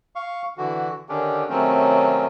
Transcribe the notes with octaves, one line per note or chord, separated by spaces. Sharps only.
F5 C#6
D3 E3 F#4
D3 D#3 C#4 D4 G4
C3 D#3 F#3 A3 C4 C#4